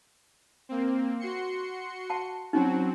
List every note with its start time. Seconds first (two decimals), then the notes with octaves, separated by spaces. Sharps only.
0.69 A#3 C4
1.20 F#4 C6 C#7
2.10 F#5 A5
2.53 F#3 C4 C#4 D#4 F#4